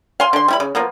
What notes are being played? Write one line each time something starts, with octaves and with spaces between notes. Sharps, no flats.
F5 G#5 C6
D3 C6
G3 E4 B5
C#3
F3 A#3 B3